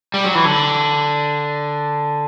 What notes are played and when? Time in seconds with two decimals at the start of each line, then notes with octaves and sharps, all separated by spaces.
0.14 G3
0.24 F#3
0.35 E3
0.46 D3